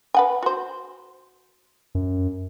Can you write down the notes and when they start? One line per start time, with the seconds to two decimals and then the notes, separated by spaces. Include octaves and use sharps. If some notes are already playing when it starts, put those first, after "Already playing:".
0.14 B4 F#5 G#5
0.43 F#4 C5
1.95 F#2